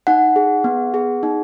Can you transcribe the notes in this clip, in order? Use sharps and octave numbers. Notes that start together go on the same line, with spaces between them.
D#4 F#5
G#4
B3
G#4
D#4